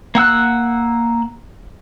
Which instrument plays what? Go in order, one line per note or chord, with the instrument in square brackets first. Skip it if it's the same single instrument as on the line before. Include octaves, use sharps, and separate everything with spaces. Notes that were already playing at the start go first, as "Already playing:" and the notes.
[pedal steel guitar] A#3 F#5 E6 F#6